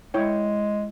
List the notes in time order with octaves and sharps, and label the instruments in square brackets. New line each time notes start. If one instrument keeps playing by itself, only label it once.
[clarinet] G#3 [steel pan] E4 C#5 G5